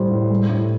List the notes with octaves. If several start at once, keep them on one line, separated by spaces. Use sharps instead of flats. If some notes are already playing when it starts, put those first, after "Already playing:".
Already playing: A2 G3 C5
A2
G3
A2